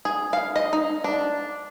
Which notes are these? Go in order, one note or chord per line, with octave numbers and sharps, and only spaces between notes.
G#4
F5
D#5
D#4
D4